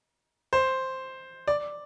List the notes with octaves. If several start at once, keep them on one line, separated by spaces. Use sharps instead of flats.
C5
D5